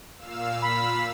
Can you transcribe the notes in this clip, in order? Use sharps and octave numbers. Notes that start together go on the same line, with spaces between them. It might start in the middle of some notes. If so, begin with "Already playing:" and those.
A#2 F5 E6
B5